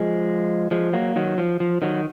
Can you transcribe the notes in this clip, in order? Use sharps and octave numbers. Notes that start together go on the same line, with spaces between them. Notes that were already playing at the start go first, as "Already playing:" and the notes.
Already playing: F3 G#3
F3 G#3
F#3 A#3
D#3 F#3
F3
F3
D#3 F#3